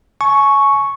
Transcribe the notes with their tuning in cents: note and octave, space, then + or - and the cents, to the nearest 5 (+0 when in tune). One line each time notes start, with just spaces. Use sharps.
G#5 +35 C#6 +0